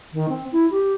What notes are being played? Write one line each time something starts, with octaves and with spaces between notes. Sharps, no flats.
D#3
C4
E4
G4